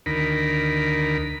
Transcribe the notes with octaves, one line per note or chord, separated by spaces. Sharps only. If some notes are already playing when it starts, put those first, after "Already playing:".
D2 D#3 A#4 B5